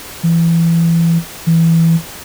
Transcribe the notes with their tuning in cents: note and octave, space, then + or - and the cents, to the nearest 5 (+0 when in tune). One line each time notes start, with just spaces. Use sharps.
E3 +20
E3 +0